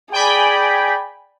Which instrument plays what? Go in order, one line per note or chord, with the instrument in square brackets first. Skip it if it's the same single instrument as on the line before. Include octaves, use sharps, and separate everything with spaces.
[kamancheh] G#4 D5 [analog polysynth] G5 G#5 B5